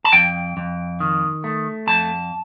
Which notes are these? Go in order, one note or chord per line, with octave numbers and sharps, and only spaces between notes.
A5
F2 G5
F2
D#3
A3
F2 A5